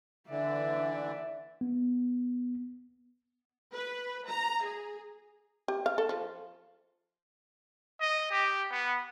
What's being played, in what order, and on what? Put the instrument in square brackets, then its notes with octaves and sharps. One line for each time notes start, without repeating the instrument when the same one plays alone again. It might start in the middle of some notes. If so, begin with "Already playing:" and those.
[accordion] D3 E3 [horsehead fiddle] D5 E5
[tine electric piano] B3
[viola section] B4
A#5
G#4
[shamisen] G4
F5
A4
F3
[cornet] D#5
G4
B3